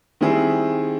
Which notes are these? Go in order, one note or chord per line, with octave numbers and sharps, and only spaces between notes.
D#3 G3 C4 E4 G#4